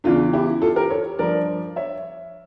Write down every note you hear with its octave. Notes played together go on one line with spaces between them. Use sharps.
E2 C#3 E3 D4 F4
E4 G4
F4 A4
G4 A#4
A4 C#5
G2 F3 A#4 D5
C#5 E5